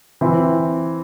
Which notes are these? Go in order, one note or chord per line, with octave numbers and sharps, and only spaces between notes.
E3 C4 E4